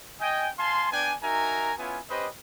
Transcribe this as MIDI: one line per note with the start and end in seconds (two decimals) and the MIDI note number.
0.20 0.48 75
0.20 0.48 79
0.20 0.48 80
0.59 0.90 77
0.59 0.90 80
0.59 0.90 81
0.59 0.90 84
0.92 1.15 59
0.92 1.15 62
0.92 1.15 74
0.92 1.15 79
0.92 1.15 80
1.22 1.73 63
1.22 1.73 66
1.22 1.73 70
1.22 1.73 76
1.22 1.73 80
1.22 1.73 82
1.78 1.99 59
1.78 1.99 61
1.78 1.99 64
1.78 1.99 65
1.78 1.99 80
2.09 2.28 61
2.09 2.28 67
2.09 2.28 71
2.09 2.28 72
2.09 2.28 75